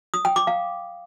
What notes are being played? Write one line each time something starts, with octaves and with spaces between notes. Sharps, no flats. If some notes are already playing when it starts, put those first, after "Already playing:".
D#6
G5
D6
F5